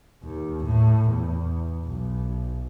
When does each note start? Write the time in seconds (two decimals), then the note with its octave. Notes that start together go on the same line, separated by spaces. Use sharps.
0.23 D#2
0.64 A2
1.09 E2
1.84 B1